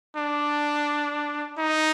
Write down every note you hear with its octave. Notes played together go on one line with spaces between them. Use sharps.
D4
D#4